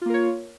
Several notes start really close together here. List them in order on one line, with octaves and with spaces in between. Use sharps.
F4 A#3 A#4 C#5